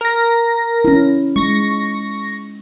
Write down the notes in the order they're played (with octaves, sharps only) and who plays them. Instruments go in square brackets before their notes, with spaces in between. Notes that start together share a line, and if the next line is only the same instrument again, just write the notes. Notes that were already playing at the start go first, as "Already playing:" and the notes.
[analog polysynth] A#4 A#6
[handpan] C#4 E4
[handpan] G#3 [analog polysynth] C#6 A#6